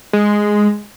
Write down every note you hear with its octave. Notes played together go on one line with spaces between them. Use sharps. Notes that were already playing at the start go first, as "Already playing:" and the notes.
G#3